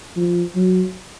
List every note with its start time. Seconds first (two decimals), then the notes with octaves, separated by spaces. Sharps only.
0.16 F3
0.55 F#3